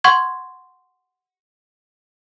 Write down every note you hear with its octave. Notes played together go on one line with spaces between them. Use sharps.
F#5 C6 C#6 G#6